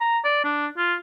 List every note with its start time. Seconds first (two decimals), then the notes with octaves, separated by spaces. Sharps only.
0.01 A#5
0.24 D5
0.44 D4
0.77 F4